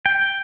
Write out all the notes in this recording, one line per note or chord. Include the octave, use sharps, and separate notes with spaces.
G5